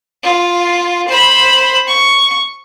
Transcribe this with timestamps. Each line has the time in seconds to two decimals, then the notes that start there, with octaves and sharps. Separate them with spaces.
0.23 F4
1.08 C5 B5
1.87 C#6